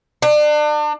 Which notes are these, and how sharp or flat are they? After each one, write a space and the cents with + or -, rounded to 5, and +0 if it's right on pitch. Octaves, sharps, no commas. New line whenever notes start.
D4 +35